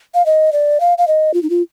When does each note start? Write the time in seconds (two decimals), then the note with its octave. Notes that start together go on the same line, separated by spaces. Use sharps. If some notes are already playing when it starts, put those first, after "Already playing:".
0.14 F5
0.26 D#5
0.53 D5
0.80 F5
0.98 F5
1.07 D#5
1.34 F4
1.43 D#4
1.50 F4